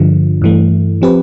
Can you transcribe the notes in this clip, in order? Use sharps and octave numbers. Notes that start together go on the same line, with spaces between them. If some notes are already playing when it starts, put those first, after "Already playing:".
Already playing: G2 D3 F3
G2 E3 A3
F3 C4 G4 B4